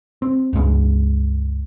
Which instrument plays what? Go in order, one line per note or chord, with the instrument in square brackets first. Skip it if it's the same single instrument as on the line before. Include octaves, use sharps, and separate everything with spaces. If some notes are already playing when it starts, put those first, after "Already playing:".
[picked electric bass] C4
C#2 G2 G#3 B3